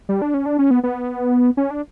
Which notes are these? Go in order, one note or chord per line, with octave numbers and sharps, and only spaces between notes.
G3
D4
C#4
D4
C#4
B3
B3
C#4
D4